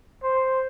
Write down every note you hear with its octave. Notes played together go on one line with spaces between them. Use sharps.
C5